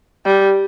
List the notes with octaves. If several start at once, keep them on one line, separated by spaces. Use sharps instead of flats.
G3